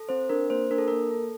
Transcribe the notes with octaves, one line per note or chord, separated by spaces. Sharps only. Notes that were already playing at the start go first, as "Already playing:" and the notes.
Already playing: A4
C4 C5
D4 A#4
A#3 C5
D4 A#4
A4
A#3 A#4
A4